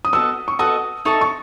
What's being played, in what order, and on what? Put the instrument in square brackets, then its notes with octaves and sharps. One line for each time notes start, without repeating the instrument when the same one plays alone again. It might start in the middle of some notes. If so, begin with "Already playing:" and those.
[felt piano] D#6
[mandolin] B3 F#4 A4 D#5 [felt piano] E6
[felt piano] C#6
[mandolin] B3 F#4 A4 D#5 [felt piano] D#6
[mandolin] D#4 A4 E5 A5 [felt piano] C#6
[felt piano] C#6